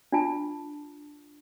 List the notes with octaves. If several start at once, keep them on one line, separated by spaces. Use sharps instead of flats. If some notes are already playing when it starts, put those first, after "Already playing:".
D4 F4 A5